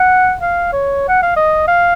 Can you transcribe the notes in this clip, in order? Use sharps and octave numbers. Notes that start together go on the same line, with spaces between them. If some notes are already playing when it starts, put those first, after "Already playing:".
Already playing: F#5
F5
C#5
F#5
F5
D#5
F5